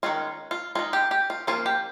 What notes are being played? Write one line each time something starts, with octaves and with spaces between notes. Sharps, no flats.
D#3 G#3 C#4 F4
F4
G#3 D#4 F4
G4
G4
F4
F3 A#3 C#4 F4
G4